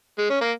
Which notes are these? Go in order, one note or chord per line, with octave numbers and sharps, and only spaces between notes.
G#3
C#4
A#3